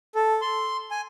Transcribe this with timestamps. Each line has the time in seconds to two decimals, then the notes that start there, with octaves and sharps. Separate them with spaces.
0.15 A4
0.41 C6
0.91 G#5